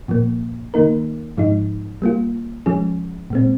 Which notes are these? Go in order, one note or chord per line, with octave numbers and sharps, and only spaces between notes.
A#2 F3 A#3
D#3 A#3 D#4 A#4
G#2 F3 G#3 D#4
G3 A#3 F4
F3 G#3 C#4 G#4
A#2 G#3 C4